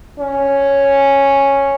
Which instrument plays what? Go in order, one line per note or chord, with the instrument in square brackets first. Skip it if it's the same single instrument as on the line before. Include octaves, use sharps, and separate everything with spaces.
[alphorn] C#4